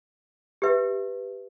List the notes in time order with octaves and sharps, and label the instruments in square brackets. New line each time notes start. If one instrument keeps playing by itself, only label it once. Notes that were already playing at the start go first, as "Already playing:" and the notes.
[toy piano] G4 B4 E5